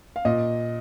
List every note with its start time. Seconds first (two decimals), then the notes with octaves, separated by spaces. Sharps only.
0.16 F5
0.25 A#2 D#5